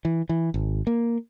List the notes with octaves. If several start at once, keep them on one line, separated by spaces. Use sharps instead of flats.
E3
E3
G#1
A#3